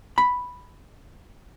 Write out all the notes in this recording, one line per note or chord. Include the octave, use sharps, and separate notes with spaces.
B5